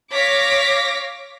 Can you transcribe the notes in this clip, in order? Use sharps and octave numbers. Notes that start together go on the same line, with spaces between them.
C#5 F5 D6 A#6 B6